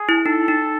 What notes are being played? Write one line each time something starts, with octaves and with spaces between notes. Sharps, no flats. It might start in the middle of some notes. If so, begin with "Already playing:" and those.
Already playing: G#4
E4
D#4 A4
D#4